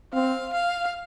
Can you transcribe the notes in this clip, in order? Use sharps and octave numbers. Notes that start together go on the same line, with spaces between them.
C4 F5
F5